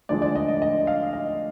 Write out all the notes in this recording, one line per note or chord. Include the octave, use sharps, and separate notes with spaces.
D2 D3 F3 G#3 D5
D5
D#5
D#5
D#5
F5
D#5